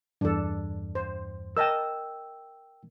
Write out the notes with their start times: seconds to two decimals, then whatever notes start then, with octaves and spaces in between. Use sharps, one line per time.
0.21 E2 G2 D4 A4
0.95 C5
1.57 A#4 D#5 G5 A5 E6